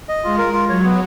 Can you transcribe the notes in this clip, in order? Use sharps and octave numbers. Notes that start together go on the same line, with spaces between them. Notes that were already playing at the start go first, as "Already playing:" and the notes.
D#5
G#3 F4
A#4
F4
F#3 C#5
B3